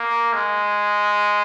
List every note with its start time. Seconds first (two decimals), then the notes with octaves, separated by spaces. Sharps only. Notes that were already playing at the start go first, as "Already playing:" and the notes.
Already playing: A#3
0.33 G#3